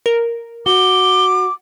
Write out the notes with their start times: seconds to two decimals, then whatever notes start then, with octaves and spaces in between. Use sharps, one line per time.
0.06 A#4
0.66 F#4 D6 G7